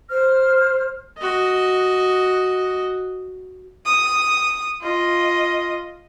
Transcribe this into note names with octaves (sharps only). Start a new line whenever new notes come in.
C5 F6
F#4 D#5
D#6
F4 D#5